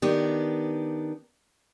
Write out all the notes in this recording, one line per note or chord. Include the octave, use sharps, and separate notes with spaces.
D#3 B3 D4 G4